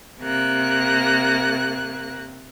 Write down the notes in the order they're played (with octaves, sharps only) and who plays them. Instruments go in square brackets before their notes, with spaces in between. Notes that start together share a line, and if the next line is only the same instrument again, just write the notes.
[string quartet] C3 A#3 F#6